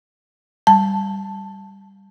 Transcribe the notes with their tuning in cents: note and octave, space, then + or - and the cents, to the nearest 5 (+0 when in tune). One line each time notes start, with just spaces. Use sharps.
G3 +0 A5 +0